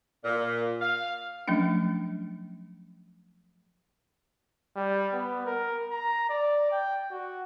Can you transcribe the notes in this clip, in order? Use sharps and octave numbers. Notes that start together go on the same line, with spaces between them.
A#2
F5
F3 F#3 A3 C#4 D4
G3
B3
A#4
A#5
D5
G5
F#4